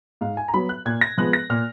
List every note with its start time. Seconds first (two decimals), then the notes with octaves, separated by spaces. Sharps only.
0.21 G#2 F5
0.37 G#5
0.48 A#5
0.54 F#3 B3 B5
0.69 F#6
0.86 A#2 G#6
1.01 A#6
1.18 F3 G#3 B3 F#6
1.33 A#6
1.50 A#2 F6